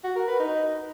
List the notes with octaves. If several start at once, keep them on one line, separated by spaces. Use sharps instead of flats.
F#4
A#4
B4
D#4